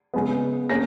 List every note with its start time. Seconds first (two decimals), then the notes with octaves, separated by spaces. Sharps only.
0.14 C#3 G#3 B3
0.69 A#3 C#4 A#6